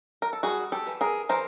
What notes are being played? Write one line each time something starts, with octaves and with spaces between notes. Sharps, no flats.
A#4
A4
G3 F#4 G#4
G4 A4
E3
G#4 A#4
E3 A#4 C5